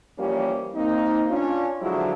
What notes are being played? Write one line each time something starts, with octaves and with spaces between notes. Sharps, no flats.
E3 F3 G3 A#3 C#4 G4
A#3 C4 D#4
C#4 D4 F4
D3 F3 F#3 G#3 E4 F#4